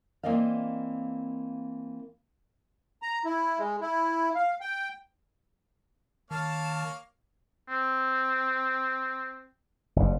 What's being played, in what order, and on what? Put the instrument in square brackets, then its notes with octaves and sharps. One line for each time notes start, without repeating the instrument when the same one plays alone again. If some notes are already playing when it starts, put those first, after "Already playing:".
[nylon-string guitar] E3 A#3 C4 D5 D#5 F5
[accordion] A#5
E4
G#3
E4
F5
G5
[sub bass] D#3 [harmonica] A#3 C#5 F5 [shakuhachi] A5
[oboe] C4
[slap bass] F#1 G2